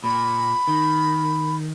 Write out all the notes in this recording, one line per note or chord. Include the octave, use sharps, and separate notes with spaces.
A#2 B5
D#3